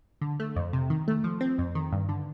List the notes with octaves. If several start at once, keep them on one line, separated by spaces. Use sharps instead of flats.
D3
A3
F2
C3
D#3
A3
F3
C4
F2
D#3
G2
D3